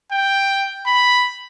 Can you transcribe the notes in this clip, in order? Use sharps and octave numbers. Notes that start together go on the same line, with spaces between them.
G5
B5